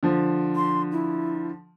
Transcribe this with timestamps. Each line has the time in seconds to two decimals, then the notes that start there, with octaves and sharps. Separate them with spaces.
0.03 D3 F3
0.56 C6
0.92 E4